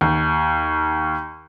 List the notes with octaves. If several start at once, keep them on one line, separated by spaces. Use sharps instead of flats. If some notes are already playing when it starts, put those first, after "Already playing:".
D#2